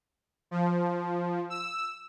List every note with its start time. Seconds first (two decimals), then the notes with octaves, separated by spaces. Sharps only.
0.51 F3
1.50 E6